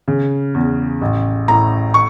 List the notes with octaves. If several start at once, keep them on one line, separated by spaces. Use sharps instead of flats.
C#3
E2
A1
A2 A#5
C#6